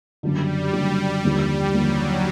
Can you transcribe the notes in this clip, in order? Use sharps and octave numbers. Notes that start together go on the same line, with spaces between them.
F#1 F#2 D3 G3
F#1 F#2 D3
D#2 D3 F3 G3 A#3
D#2 D3 F3 F#3 A#3